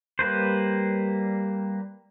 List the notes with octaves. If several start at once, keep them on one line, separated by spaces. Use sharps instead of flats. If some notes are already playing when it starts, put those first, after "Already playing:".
G3 A#3 B4 C5